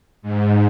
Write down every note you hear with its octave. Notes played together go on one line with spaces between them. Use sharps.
G#2